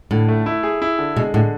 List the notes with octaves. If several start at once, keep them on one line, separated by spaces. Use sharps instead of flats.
A2 D3
A3
E4
G#4
E4
D3
B2 G#3
A2 D3